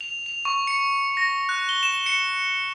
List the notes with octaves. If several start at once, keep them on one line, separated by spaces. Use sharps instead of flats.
F7
F7
C#6
C#7
A#6
F#6
G7
E7
C#7